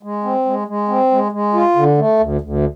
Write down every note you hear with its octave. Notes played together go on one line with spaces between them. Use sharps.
G#3
C4
G#3
G#3
C4
G#3
G#3
F4
D3
A3
D2
D2